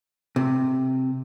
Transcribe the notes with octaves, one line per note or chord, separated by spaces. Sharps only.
C3